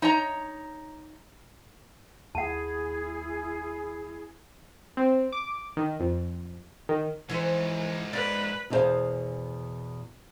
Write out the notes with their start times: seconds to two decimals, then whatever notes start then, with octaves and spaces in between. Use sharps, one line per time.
0.02 D#4 C#5 A#5
2.35 D#2 E4 G#4 F#5 A5
4.97 C4
5.32 D6
5.77 D#3
6.00 F2
6.89 D#3
7.30 G#2 E3 C#4 E4 C5
8.13 B4 D5
8.70 E2 B2 D#4 G#4 C5 F5